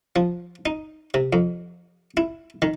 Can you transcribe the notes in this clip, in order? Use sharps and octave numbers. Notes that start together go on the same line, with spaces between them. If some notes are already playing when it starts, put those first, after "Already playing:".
F3
D#4
C3
F2
E4
D#3